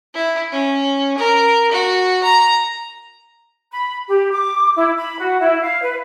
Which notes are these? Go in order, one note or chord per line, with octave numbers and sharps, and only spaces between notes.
E4
C#4
A#4
F#4
A#5
B5
G4
D6
E4
B5
F#4
E4
F5
B4